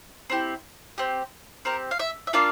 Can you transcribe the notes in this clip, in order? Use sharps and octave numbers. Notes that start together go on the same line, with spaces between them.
C4 E4 G4
C4 G4
C4 G4 A#4
F5
E5
E5
A#3 D4 F4 F5